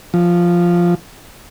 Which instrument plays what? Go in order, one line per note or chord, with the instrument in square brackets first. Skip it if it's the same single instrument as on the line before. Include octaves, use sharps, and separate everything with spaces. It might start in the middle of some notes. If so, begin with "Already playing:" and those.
[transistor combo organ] F3